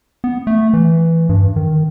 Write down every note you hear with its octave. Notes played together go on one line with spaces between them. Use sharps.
B3
A3
E3
G2
D#3